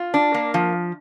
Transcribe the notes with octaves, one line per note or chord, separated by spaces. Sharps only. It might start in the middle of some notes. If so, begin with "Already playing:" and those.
Already playing: F4
D4
A#3
F3